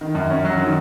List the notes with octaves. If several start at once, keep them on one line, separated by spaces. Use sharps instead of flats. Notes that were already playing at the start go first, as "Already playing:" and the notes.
D#3
F#2
C#4
F#3
D#3